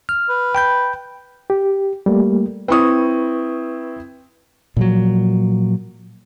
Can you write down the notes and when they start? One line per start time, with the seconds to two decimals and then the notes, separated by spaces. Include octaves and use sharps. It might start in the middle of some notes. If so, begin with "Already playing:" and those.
0.09 F6
0.29 B4
0.55 G5 B5 G6
1.50 G4
2.06 G3 A3 A#3
2.68 C4 E4 B4 C#6 D#6
4.77 A#2 F3 F#3